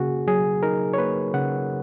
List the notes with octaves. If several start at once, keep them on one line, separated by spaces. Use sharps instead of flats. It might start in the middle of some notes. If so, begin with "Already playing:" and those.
Already playing: C#3 A#3 F#4 G#4
F#3 G#4
D#4 A#4
C#5
A#3 B4
C#3 F#5